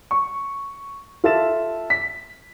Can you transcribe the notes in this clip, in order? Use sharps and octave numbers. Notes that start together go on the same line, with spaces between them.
C#6
F4 A4 E5 A6 E7
B6